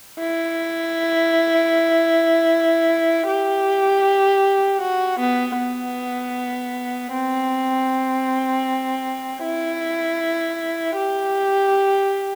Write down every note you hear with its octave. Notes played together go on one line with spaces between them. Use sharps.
E4
G4
F#4
B3
B3
C4
E4
G4